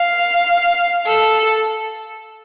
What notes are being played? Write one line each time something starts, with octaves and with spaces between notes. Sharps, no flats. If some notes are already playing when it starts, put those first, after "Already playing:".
Already playing: F5
A4